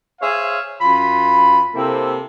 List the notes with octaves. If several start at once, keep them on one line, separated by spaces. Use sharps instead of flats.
G#4 C5 C#5 E5 F5
F#2 F4 B5
C3 A#3 C4 E4 A4